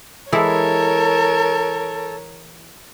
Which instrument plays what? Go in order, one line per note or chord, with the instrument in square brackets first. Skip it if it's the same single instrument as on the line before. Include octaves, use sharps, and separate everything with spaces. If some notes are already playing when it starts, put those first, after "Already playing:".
[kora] E3 G#3 E4 [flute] A4 [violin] A#4 C#5